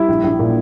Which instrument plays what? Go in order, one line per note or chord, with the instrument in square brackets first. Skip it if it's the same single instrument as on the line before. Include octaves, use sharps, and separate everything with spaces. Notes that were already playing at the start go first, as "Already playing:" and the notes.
Already playing: [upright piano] G3 [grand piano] E4
[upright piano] A#1
A#1
A#2